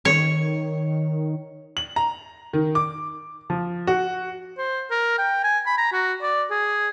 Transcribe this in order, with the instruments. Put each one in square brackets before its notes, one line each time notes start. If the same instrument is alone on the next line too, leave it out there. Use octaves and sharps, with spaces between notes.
[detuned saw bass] D#3 [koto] C#5
[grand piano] F#7
A#5
D#3
D6
F3
F#4
[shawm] C5
A#4
G5
G#5
B5
A#5
F#4
D5
G#4